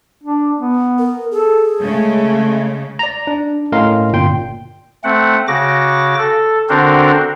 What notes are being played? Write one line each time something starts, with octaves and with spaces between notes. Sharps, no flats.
D4
B3
A#4
G#4 A4
C#3 G#3 A3
D5 A#5
D4
A2 C#4 A#4 D#5 F5 C6
G1 A#2 G5 C6
A3 C4 F#5
C#3 F#4 D6 A#6
A4
D3 C4 D4 F#4 A#4 C5